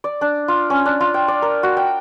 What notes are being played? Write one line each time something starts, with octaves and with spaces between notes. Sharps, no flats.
D5
D4
F4
C#4
D4
F4
G5
D5
A#4
F#4
G5